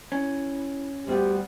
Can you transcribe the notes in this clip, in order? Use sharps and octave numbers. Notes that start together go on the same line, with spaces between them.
C#4 E4
D2 G3 B3 G4 G5